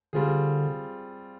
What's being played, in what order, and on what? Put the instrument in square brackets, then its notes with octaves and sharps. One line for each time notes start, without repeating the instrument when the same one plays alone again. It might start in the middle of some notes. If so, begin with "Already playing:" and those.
[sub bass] D3 [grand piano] G3 C4 F4 G#4